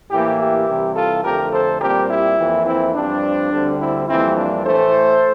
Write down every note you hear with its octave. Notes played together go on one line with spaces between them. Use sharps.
A2 E3 A#3 E4 G4
E4 G4
C2 C3 E3
F4 A4
F2 D3 A3 G4 A#4
A4 C5
A#2 G3 C4 G4 A#4
E4 G4
F2 E3 A#3
C4 E4
G2 F3 C4 D4
D2 D3 G3 C4
C4 E4
F2 E3 G3 A#3 C4 E4
D4 F4
A2 E3 A3 A4 C5